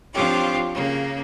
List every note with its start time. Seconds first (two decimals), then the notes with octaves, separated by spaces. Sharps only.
0.14 F3 C4 D4 F4 G4 C#5
0.74 C#3 A#3